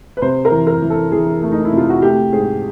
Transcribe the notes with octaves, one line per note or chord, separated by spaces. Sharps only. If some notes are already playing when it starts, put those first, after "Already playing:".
B4
C3 C5
A#4
E3
A#4
E3
A4
E3 G#4
A3
D#4
E4
C3 F4
F#4
A3 G4
G#2 G#4